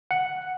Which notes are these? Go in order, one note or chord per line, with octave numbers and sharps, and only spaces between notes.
F#5